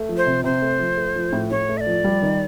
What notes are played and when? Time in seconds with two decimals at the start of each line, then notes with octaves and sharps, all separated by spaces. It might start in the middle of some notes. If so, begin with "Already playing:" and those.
Already playing: A3
0.09 F3
0.17 C5
0.26 C3
0.44 C3 C5
0.62 A3
0.80 F3
0.97 A3
1.16 F3
1.33 A2
1.50 A2 C#5
1.69 A3
1.77 E5
1.81 D5
1.87 F3
2.04 G3
2.23 D#3